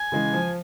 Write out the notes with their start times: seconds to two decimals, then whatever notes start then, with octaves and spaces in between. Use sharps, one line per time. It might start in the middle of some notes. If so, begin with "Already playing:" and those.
Already playing: G#5
0.12 C#3 E3 G#3
0.33 F3